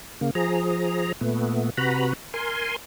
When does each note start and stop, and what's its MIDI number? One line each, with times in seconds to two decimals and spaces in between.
0.21 0.31 49
0.21 0.31 58
0.35 1.12 53
0.35 1.12 68
0.35 1.12 82
1.21 1.70 46
1.21 1.70 57
1.21 1.70 59
1.77 2.13 48
1.77 2.13 66
1.77 2.13 71
1.77 2.13 82
1.77 2.13 83
2.34 2.76 70
2.34 2.76 80
2.34 2.76 84